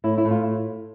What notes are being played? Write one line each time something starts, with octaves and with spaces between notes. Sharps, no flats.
A2 E4
E4
A2
F4